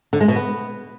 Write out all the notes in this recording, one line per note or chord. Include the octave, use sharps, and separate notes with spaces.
D3
G#3
B2
B3